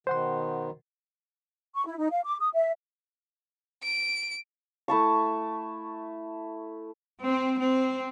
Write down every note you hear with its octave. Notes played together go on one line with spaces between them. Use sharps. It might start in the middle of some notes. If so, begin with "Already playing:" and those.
B2 D#3 C5 F#5 C6
C#6
E4
D#4
F5
D6
D#6
E5
D7
A3 E4 A5 C#6
C4
C4